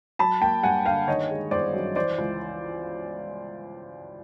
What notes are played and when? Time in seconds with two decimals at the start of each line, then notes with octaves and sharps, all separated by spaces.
0.19 F#3 A5 B5
0.41 A#3 G5 A5
0.63 G2 F#5 G#5
0.85 D3 F5 G5
1.07 D#3 C#5 D#5
1.30 G#3
1.51 G1 C5 D5
1.74 F#2
1.96 E3 C5 D5
2.18 C#2